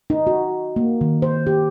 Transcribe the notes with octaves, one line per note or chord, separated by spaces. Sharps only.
D#4
F#4
A#3
D#3
C5
G4